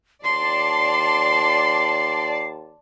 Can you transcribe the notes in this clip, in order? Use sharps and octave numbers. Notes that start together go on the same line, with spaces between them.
D#2 D5 A5 C6 C7